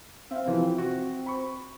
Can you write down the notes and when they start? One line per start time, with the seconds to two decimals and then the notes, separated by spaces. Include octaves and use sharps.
0.31 C4 E5 F5
0.46 C3 E3 F3
0.78 F#4
1.26 B5 C#6